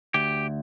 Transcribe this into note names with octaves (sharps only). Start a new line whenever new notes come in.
D2 G4